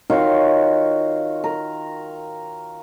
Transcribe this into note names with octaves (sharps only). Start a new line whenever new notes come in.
D#3 F4 F#4 C#5
A#4